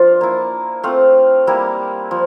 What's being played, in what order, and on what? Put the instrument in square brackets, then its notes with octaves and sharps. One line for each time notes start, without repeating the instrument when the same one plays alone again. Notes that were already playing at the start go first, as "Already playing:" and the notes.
Already playing: [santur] F3 D4 F4
A#3 E4
A3 C4 F4 F5
G3 A#3 E4
F3